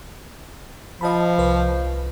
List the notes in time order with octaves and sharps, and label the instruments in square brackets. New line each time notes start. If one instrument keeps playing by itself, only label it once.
[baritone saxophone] F3 [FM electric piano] D#5 A5 B5
[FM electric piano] C2 B4